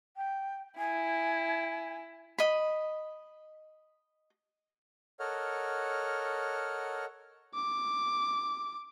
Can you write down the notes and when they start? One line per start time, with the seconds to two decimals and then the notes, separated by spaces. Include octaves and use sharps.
0.17 G5
0.78 E4 G#5
2.38 D#5 B5
5.20 A4 A#4 C#5 D#5 F#5 F6
7.55 D6